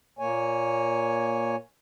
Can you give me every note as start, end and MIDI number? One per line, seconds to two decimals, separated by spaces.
0.19 1.56 46
0.19 1.56 58
0.19 1.56 73
0.19 1.56 80